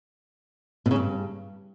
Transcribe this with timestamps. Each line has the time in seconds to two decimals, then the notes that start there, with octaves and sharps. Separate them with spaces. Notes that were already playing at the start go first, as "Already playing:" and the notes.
0.86 B2
0.91 C#3
0.96 G2